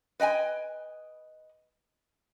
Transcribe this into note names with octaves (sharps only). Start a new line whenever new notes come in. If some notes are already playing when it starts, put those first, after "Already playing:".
B4 D#5 G5 G#5